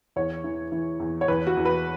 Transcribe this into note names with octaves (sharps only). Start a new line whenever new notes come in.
E2 C#5
E3
E3
E2
C#5
E2 B4
F#4
E2
B4